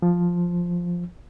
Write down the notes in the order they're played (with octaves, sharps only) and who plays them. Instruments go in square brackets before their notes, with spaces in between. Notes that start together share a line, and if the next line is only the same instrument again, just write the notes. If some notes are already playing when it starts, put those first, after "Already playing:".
[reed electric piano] F3